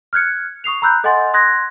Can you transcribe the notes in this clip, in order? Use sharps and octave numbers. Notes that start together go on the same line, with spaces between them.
F6 F#6 G#6 C#7
C#6 D#6 C7 F7
A#5 B5 E6 F#6 G6
A4 D#5 F#5 G#5 C6 A6
C6 D#6 F#6 G#6 A#6